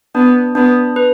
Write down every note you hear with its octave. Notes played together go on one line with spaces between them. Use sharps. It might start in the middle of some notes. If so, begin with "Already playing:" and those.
B3 D4
B3 D4
B4